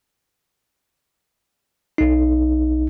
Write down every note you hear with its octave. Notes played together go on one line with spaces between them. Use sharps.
B1 D#4